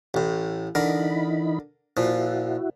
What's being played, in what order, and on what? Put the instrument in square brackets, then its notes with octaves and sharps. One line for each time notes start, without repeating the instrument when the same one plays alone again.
[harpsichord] A1 A2
[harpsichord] D3 A#4 [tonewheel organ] E3 D#4 B5
[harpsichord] A#2 F3 [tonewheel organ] E4 F#4